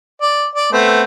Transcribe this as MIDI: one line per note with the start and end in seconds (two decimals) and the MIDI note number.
0.21 0.46 74
0.55 0.68 74
0.72 1.03 57
0.72 1.03 59
0.72 1.03 60